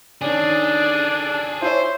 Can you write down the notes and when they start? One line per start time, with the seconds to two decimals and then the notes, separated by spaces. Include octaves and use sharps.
0.21 D#3 C#4 D4 G#4 A4
1.62 E4 C5 C#5